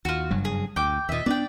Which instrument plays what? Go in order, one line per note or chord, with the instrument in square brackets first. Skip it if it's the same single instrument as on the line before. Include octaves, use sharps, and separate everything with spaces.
[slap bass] D#2 [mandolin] F4 F#4
[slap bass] F#1 G2 F#3
[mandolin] G#4
[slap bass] D2 [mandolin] G5 D6
[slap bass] D#2 A#2 [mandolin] D#5 E5
[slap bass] B3 C#4 D4 [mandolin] D5 G5